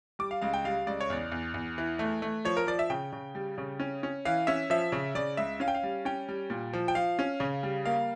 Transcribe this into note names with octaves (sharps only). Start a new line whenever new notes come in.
G3 D6
F5
C#2 F5
G5
G3 F5
C#2 D5
C#5
E2 D5
E2
E2
E3
A3
A3
F3 C#5
A#4
F3 D5
E5
C#3 G5
C#3
G3
C#3
C#4
C#4
E3 F5
C#4 E5
F3 E5
C#3
C#3 D5
C#2 E5
C#4 F5
G5
F5
G3
C#4 G5
G3
A#2
F3
G5
F3 F5
C#4
C#3
G3
A#3 F5